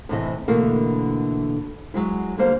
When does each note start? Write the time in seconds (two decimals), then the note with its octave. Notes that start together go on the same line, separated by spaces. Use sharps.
0.09 A2 C3 E3 D#5
0.48 B2 D3 E3 A3 A#3 E4
1.94 F#3 G#3 E4
2.38 D3 G3 A#3 C5